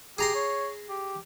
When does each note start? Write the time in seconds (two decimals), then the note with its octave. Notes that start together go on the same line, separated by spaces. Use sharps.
0.18 G4 G#4 A#5 C6
0.35 C#5
0.89 G4